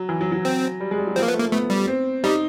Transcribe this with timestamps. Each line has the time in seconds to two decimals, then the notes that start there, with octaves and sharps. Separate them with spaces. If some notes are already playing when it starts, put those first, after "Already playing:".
Already playing: F#3
0.09 E3
0.21 F#3
0.32 F#3
0.45 C4
0.80 G3
0.91 G#3
0.98 G3
1.07 F#3
1.16 F3 C4
1.23 A#3
1.28 B3
1.34 A3
1.40 A#3
1.52 A3 B3
1.70 G3
1.87 C4
2.24 G3 D#4